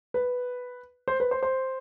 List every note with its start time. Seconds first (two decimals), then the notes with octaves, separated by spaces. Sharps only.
0.14 B4
1.08 C5
1.20 B4
1.31 C5
1.43 C5